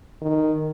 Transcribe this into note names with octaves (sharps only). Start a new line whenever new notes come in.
D#3